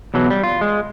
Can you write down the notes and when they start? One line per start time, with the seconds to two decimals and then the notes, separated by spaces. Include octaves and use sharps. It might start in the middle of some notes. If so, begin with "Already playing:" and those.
0.14 E2 B2 E3 F#3
0.30 G3
0.44 F4
0.61 G#3